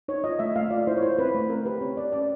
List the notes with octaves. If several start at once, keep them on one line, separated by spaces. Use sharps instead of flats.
D#4 C#5
F4 D#5
A3 E5
A3 F5
F4 D5
E4 C5
C#5
E4 C5
C4 B4
A3
C4 A#4
G4 B4
C4 C#5
C4 D5
C#4 D5